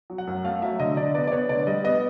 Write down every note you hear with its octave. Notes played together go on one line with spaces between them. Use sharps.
F#3
F#5
F#2
A3 F5
F#3 E5
D3 D#5
D3 D5
B3 D5
D5
B3 C#5
D3 D5
G3 D#5
B3 D#5